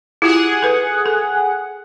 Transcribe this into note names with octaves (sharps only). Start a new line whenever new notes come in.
E4 F4 G4 G#4 F#5
A4 B4
A4